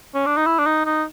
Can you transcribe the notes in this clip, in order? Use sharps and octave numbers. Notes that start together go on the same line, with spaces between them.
C#4
D4
D#4
E4
D4
D#4
D#4